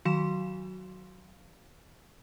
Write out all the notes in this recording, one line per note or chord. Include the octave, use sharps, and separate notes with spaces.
D#3 F#3 F#4 F5 C6 E7